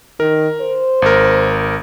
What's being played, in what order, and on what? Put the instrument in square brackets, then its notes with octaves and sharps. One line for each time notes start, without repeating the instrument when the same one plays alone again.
[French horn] D#3 [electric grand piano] A#4
[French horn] C5
[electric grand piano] G#1 A#4